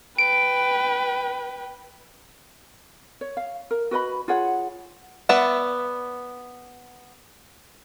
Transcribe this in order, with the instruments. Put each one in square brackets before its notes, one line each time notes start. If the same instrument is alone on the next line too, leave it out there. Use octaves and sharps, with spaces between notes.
[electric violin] B4 G5 [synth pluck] D7
[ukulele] C#5
F5
A#4
F#4 B4 D#5 B5
F4 G#4 C#5 F#5
[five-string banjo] B3 B4 D5 E5 F#5